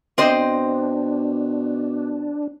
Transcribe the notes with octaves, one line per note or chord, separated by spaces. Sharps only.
B2 C4 D4 C5 D#5